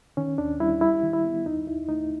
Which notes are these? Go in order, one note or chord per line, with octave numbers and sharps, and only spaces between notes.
D#3 C#4
D#2 D4
G3 E4
G3 E4
D#3
E4
B3
D#2 D#4
D#2 E4
A3 D#4